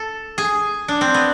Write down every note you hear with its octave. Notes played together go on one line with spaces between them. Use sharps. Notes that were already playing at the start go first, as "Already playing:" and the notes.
Already playing: A4
G#4
D4
C4
B3